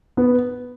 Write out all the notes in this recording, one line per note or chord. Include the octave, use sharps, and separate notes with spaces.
B3